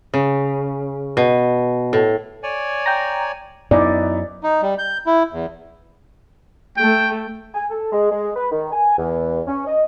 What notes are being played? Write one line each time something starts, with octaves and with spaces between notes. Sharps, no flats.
C#3
B2
A2
C#5 D5 G#5
G5 A#5
F#2 B3 D#4 E4 D5
D#4
G3
G6
E4
E2
A3 G5
G#5
A4
G#3
G#3
B4
D#3
G#5
E2
C#4
D#5